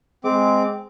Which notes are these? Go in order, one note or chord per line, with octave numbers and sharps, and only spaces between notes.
G#3 C4 D6